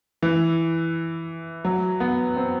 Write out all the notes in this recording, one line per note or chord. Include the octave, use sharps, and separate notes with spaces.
E3
F#3
B3
C4